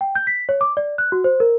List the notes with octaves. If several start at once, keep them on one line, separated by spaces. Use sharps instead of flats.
G5
G6
B6
C#5
D6
D5
F#6
F#4
C5
A#4